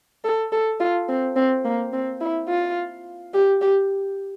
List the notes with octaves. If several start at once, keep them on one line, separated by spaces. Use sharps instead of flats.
A4
A4
F4
C4
C4
A#3
C4
E4
F4
G4
G4